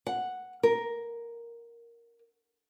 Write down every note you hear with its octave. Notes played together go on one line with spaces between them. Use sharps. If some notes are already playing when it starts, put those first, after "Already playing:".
F#5
A#4